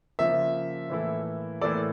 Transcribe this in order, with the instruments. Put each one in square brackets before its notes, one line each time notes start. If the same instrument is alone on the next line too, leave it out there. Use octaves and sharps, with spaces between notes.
[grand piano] C#3 F3 A#3 [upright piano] E5
[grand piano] A2 E3 A#3 E4 A4
[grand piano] A2 E3 A#3 E4 A4 [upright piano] D5